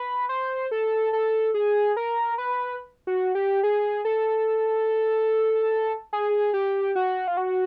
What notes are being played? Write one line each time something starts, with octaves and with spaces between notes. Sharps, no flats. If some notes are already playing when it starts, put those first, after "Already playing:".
Already playing: B4
C5
A4
A4
G#4
A#4
B4
F#4
G4
G#4
A4
G#4
G4
F#4
F4
F#4